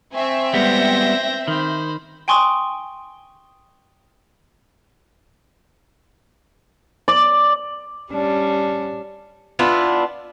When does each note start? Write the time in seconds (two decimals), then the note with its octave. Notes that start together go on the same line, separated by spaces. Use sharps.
0.14 C4 E5 G#5 C#6
0.53 G3 G#3 B3 G6 A#6
1.48 D#3 C5 B5
2.28 G5 G#5 C6 C#6 D#6
7.08 D5
8.12 G3 C#4 D4
9.59 B3 D4 E4 F4